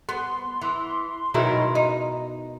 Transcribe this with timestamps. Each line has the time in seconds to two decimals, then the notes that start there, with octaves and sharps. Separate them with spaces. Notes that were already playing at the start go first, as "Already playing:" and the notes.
0.09 B3 C6
0.62 E3
1.34 B2 D#3 F#3 G#3 E4 A#4
1.75 D#4